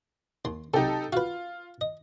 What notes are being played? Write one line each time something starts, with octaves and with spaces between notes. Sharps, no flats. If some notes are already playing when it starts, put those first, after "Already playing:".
D#2 C6
B1 C3 D#4 G4 A4
F4 F#4 B4
D#5